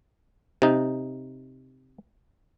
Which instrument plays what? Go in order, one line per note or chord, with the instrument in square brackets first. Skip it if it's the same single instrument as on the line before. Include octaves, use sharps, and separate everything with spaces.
[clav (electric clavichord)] C3 D#4